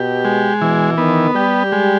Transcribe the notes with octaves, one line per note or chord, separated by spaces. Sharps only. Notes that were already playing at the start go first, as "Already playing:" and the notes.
Already playing: B2 G4
G#3
B2 E3
D#3 B3
G3 G4
G#3